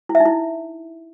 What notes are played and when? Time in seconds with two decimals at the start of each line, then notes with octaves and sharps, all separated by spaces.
0.09 E4
0.15 E5
0.20 D#4
0.26 E4